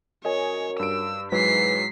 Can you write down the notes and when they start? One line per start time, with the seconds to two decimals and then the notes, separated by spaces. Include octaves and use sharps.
0.25 F#2 C#5 D#5 G#5
0.80 G2 E6 D7
1.32 G#2 E3 F#3 G#3 B6 C7